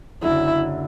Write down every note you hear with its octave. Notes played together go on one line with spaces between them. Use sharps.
F#1 F#2 D3 E4